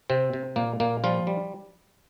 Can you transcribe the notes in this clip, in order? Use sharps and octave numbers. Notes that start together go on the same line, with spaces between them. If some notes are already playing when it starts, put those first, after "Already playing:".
C3 C4
C3
A#2 A#3
A#2 A#3
F3 G3 F4
G3